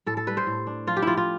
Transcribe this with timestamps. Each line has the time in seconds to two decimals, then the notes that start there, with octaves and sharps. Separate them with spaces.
0.06 A2 A4
0.17 A4
0.27 G3 B4
0.37 C5
0.47 A2
0.67 D4
0.87 F3 F4
0.97 G4
1.02 F3 E4 F4
1.17 F4